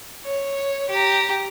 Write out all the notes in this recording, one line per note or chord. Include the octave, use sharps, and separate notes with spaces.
C#5
G4 A#5